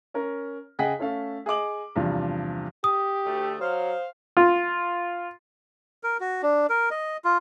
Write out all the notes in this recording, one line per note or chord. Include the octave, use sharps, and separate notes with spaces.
C#4 A#4
C#3 G#4 D#5 F#5 G5 B6
A3 C#4 A4 F5
G#4 D#5 D6 F#7
E2 G2 C3 F3
G4 D#6
D2 A3
F#3 C5 F5
F4
A#4
F#4
D4
A#4
D#5
F4